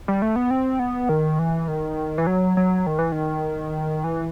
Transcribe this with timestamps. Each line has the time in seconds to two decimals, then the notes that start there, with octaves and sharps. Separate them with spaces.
0.08 G3
0.22 A3
0.36 B3
0.51 C4
0.79 B3
1.09 D#3
1.39 E3
1.68 D#3
2.18 E3
2.27 F#3
2.57 F#3
2.87 D#3
2.99 E3
3.12 D#3
4.04 E3